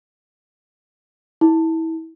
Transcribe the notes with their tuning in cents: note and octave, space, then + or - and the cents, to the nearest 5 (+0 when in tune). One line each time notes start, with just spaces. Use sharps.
E4 -30